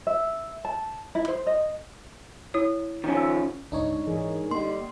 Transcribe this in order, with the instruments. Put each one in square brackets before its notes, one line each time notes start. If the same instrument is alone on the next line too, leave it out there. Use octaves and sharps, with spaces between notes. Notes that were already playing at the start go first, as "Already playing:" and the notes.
[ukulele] E5
A5
E4
C5
D#5
[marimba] E4 C#5
[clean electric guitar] D#3 F3 C#4
[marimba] E6
[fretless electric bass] D2 G#2 [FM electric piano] D4 D#4 C#5
[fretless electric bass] G#2 E3 [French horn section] G#4 A#4
[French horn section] D3 G3 D#5 [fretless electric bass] A#3 [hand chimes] C6